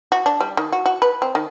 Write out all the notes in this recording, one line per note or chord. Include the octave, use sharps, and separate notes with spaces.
F#4
D4
G3
D#3
F#4
F#4
B4
C4
D#3